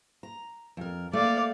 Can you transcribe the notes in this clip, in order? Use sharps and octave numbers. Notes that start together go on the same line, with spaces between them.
A#5
F2 A#4
A3 A#3 D5 F5